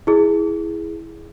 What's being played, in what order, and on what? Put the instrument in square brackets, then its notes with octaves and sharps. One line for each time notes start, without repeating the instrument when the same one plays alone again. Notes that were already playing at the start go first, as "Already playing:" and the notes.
[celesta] E4 G#4